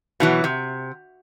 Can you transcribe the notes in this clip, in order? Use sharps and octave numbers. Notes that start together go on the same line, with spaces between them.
B2 E3 F#3
C3